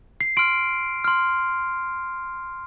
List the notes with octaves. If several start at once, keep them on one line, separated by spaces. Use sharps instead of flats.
C7
C6 F6 D7
C6 F6